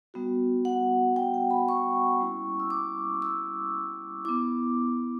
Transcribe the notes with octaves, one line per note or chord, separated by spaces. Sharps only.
G3 B3 F#4
F#5
G5
G5
B5
C#6
G3 A#3 C#4 E4
E6
D6
E6
B3 E4 D6